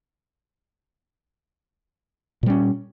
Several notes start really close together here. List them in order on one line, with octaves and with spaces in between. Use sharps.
A#2 G3 C#4